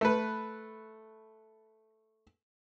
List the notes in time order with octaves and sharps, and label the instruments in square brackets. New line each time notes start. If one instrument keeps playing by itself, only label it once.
[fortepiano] A3 B4